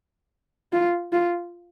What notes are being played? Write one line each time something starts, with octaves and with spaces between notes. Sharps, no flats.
F4
F4